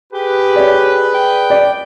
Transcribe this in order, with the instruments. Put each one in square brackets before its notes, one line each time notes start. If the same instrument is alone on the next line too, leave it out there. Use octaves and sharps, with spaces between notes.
[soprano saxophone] G4 [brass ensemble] G#4 B4
[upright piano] C#5 D5
[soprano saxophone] G5
[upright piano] D5